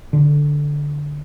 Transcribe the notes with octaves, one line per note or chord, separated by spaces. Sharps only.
D3